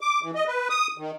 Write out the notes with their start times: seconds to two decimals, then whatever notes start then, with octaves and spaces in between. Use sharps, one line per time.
0.01 D6
0.22 E3
0.35 D#5
0.47 B4
0.70 D#6
0.98 D#3